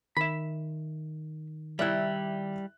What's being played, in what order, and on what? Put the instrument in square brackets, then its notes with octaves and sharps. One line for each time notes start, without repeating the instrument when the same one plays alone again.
[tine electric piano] D#3 [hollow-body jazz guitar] E5 B5
[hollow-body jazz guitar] G3 E4 [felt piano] D5 E5 F#6